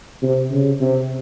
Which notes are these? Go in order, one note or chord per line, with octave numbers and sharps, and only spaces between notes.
C3
C#3
C3